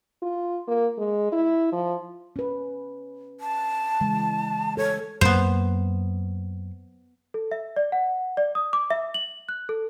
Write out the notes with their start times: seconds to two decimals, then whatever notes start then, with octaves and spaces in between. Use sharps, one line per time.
0.23 F4
0.68 A#3
0.98 G#3
1.32 E4
1.73 F3
2.36 C#4 B4
3.40 A5
4.01 C#3 E3 G#3
4.77 A4 C#5
5.21 F#2 A#3 B3 C5
7.34 A4
7.51 E5
7.76 D5
7.92 F#5
8.37 D5
8.55 D#6
8.73 D6
8.90 E5
9.14 F#7
9.49 F#6
9.69 A4